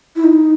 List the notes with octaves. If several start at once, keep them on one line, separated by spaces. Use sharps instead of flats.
E4
D#4